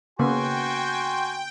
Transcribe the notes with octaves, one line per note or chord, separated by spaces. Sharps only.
C#3 A#3 B3 F#4 G5 G#5 C6